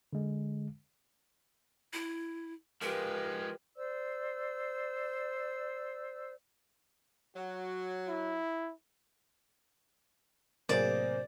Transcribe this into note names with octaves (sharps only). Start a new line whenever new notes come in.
D3 G#3
E4
F3 G#3 G4 A#4 B4
C5 D5 E6
F#3 F#4
E4
A2 C3 F#3 A#3 G#4 C5 D5